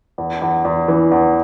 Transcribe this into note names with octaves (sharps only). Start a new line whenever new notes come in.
E2
E2
E2
E3
E2